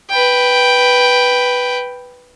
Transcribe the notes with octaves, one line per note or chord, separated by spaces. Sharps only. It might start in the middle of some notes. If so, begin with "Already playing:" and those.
B4 G5